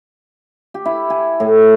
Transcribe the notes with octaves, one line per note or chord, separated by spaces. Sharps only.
G4
E4
G#5
A2